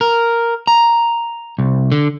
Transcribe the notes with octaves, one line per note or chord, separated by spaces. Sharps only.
A#4
A#5
C2
D3